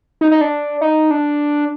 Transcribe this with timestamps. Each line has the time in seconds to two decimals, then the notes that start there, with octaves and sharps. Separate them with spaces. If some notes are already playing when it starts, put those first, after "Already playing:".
0.21 D#4
0.31 D#4
0.41 D4
0.81 D#4
1.11 D4